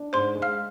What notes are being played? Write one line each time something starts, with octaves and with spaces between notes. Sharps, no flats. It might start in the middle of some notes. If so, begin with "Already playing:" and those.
Already playing: D4
G#2 C5 C6
G#3
F5 F6